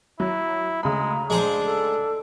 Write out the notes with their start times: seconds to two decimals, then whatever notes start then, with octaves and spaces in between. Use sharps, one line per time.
0.20 F#3 E4
0.83 D2 C#3 G#3 A#5 B5
1.30 G#3 D4 G#4 C5
1.65 A4